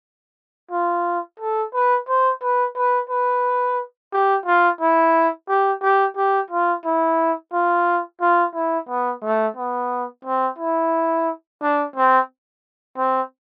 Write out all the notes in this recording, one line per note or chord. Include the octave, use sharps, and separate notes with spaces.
F4
A4
B4
C5
B4
B4
B4
G4
F4
E4
G4
G4
G4
F4
E4
F4
F4
E4
B3
A3
B3
C4
E4
D4
C4
C4